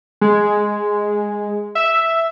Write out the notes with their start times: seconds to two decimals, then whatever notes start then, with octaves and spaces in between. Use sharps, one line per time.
0.21 G#3
1.75 E5